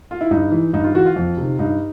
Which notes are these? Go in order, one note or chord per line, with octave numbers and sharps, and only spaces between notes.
F4
E4
G2 D#4
E3
G2 D#4
F4
E3 F#4
F4
F2
C3 D#3
G2 D#4